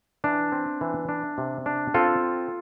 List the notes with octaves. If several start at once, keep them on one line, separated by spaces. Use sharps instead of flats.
E3 D4
C4
E3
D4
C3
D4
C4 F4 A4